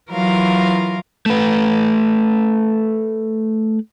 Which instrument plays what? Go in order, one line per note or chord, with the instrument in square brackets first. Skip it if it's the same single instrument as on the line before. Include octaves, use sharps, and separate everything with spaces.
[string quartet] E3 F#3 F4 A#4 F5
[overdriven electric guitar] A3 B4